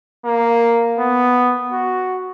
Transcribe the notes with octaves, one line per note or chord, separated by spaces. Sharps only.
A#3
B3
F#4